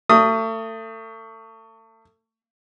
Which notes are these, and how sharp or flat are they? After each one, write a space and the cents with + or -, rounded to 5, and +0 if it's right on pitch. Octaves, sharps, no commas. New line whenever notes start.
A3 +30 D#6 +0